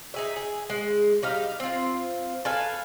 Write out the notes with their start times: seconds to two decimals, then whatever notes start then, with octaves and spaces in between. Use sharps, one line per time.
0.14 D#4 G#4 E5
0.36 G#4
0.70 G#3
1.23 G3 D#4 F5
1.60 C4 F4
2.45 A4 B4 F5 G#5